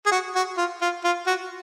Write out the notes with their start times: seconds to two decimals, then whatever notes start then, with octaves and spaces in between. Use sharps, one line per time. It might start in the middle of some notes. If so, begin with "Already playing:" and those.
0.06 G#4
0.12 F#4
0.35 F#4
0.57 F4
0.82 F4
1.04 F4
1.27 F#4